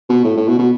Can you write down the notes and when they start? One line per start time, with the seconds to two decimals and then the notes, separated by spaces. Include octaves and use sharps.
0.09 B2
0.24 A2
0.37 A2
0.48 B2
0.59 B2